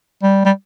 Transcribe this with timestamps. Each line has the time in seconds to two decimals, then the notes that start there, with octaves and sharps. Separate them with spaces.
0.23 G3
0.45 G3